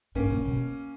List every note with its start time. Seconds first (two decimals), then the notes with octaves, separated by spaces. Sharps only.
0.15 G#2 A#3 C#4
0.30 A#2
0.45 B2